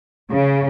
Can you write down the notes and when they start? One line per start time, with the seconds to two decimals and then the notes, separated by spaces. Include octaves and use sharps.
0.31 C#3